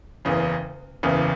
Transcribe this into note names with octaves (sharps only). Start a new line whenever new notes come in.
F#1 E2 C#3
F#1 E2 C#3